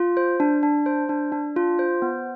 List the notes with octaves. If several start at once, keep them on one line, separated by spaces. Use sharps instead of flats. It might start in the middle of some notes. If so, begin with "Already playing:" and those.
Already playing: F4
C5
D4
D4
C5
D4
D4
F4
C5
B3